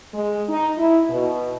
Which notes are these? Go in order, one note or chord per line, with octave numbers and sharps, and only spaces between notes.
G#3
D#4
E4
B2